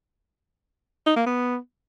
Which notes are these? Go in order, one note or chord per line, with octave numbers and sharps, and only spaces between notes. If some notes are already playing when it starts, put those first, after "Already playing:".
D#4
A#3
B3